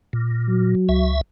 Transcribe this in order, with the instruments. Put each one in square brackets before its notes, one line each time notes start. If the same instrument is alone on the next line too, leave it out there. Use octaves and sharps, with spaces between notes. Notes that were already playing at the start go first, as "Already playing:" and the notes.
[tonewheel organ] A#2
[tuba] F#3
[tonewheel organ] C#2 E5